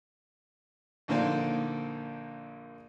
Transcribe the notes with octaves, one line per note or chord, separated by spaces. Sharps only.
A#1 D3 A#3 D#4 C5 D5